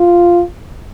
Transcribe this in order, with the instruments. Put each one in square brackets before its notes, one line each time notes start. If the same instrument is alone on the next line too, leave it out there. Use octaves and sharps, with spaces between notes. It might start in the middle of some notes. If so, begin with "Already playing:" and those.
Already playing: [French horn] F4